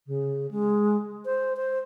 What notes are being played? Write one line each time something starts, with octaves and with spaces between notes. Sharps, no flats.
C#3
G#3
C5
C5